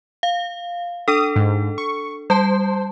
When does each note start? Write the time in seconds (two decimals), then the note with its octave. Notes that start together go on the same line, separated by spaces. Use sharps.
0.23 F5
1.08 D4 A4 D#6
1.36 G#2
1.78 C#6
2.30 G3 C5 A5